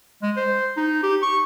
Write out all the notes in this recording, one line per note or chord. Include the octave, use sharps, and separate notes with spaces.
G#3
C5
D#4
G4
C#6